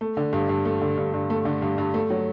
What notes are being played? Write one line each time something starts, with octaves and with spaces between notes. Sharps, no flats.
A3
D3
G2
G2
A3
D3
G2
G2
A3
D3
G2
G2
A3
F#3